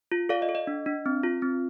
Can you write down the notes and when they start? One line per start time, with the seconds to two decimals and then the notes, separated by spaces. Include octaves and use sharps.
0.12 F4
0.29 A4 D5 F5
0.42 D#5
0.49 A4
0.55 D#5
0.67 D4
0.86 D4
1.06 C4
1.23 F4
1.42 C4